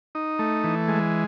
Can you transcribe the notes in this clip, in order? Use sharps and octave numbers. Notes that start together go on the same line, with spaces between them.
D#4
A3
E3
G#3